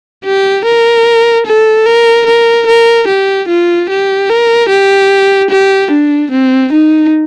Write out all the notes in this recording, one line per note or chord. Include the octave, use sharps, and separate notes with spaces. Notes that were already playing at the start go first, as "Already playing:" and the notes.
G4
A#4
A4
A#4
A#4
A#4
G4
F4
G4
A#4
G4
G4
D4
C4
D#4